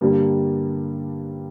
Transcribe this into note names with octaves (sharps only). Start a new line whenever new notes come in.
G2 D3 G3 A#3